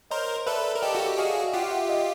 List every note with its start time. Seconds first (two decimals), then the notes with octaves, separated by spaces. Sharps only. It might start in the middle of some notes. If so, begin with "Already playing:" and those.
0.11 A#4 C5 C#5 D#5
0.46 A4 B4 D5 E5
0.75 A#4
0.82 G4 A4 D#5 F5
0.95 F#4
1.07 G4
1.18 F#4 G#4 D#5 F5
1.53 F4 G4 F#5
1.63 F5
1.71 E5 F#5
1.89 D#5 F5